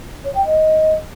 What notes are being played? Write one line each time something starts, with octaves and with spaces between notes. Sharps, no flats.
C#5
G5
D#5